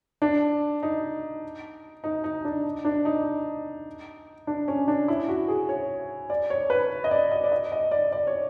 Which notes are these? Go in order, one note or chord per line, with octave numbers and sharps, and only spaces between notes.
D4
D#4
D#4
D#4
D4
D4
D#4
D4
C#4
D4
E4
F#4
G#4
C#5
D5
C#5
B4
D#5
D5
D#5
D5
D#5
D#5
D5
D5
C#5